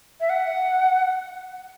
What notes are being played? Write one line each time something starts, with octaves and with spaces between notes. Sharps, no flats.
E5
F#5